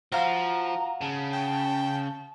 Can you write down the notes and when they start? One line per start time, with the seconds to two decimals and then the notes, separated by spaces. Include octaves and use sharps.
0.12 F3 F#4 F5 A#5
1.01 C#3 A5
1.33 G5